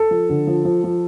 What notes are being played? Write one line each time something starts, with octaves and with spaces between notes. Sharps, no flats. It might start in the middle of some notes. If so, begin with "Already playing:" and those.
Already playing: A4 A5
F3
D3
F3
F3
F3